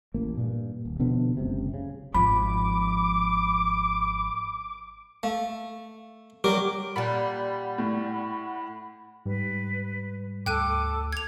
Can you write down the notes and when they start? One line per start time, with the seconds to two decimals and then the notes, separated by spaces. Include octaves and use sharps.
0.14 A1 A#3
0.37 G2 A#2
0.85 D#1
0.99 B2 D3 F3 B3
1.37 F#1 C#2 C3
1.74 C#3
2.14 G#1 F3 B5 D6
5.23 A3 F5
6.44 F#3 G3 G4 A#4 D6
6.96 A#2 G3 F#5 B5
7.78 A2
9.25 G#2 G3 B4
10.46 D2 A4 G5 D6 F#6 D#7
11.12 G#6 F7